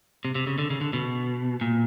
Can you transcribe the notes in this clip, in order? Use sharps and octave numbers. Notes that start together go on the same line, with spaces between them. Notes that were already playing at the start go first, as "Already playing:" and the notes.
C3
C3
C#3
D3
C#3
D3
B2
A#2